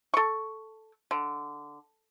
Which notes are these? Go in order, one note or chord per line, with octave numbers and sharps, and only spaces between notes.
A4 C#6
D3